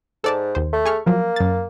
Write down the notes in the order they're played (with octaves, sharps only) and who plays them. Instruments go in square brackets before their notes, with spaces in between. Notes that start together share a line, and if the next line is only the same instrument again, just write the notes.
[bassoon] G#2 [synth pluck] A4 D5 A5
[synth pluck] D#2 C5
[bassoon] A3
[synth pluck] G#4 C#6 F6
[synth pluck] F3 F#3 [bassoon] A#3
[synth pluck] F#2 A6